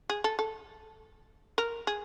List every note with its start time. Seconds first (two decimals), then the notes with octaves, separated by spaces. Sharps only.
0.10 G#4
0.24 A4
0.39 A4
1.58 A#4
1.87 G#4